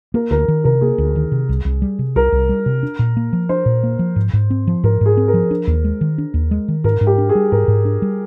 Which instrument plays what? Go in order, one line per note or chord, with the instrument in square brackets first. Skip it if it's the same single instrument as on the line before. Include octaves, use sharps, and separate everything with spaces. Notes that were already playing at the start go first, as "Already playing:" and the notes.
[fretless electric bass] A#3 [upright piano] A#4
[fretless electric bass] D2 [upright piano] A#4
[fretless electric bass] D#3
[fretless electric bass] C3 [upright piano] A#4
[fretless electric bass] A#3 [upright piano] G#4
[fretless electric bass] D2
D#3
C3
C2
C2
G3
C3
[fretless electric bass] C2 [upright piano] A#4
[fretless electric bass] C2
G3
C3
D4
A#2
A#3
F3
[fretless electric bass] D4 [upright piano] C5
[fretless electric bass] A#2
A#3
F3
G#2
G#2
C4
F3
[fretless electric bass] G#2 [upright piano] A#4
[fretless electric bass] G#2 [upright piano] G#4
[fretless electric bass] C4
[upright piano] A#4
[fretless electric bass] F3
D4
D#2
G#3
D#3
D4
D#2
G#3
D#3
[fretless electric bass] G#2 [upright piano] A#4
[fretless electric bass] G#2
[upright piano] G4
[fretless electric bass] D4
[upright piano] G#4
[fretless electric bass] G3
[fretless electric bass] G#2 [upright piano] A#4
[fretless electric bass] G#2
D4
G3